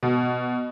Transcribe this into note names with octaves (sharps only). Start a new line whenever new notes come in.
B2